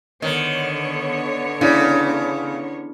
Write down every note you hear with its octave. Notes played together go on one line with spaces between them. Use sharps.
D3 D#3 B3 C#5
C#3 D4 E4 D5